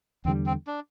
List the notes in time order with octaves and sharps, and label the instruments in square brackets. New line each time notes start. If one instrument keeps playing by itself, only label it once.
[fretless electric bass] E2 D3 G3 [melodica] C4
[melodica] C4
D4